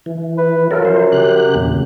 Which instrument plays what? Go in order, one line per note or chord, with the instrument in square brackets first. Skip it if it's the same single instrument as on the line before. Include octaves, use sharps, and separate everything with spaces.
[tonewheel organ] E3
[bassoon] B4
[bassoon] F#2 [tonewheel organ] F4 A4 A#4
[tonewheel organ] F3 C5
C#3 G4 F#6
E2 A#2 C#3